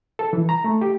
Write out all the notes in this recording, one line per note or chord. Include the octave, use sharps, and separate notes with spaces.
A4
E3
A#5
A3
G4